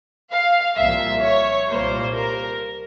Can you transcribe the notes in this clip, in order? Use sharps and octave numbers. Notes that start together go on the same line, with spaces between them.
F5
C2 A#2 F3 E5
C#5
C2 A#2 G3 A#3 C5
A#4